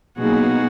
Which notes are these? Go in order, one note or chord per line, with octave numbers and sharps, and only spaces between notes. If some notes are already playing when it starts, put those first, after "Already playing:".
B2 F#3 A#3 D#4 F#4 G#4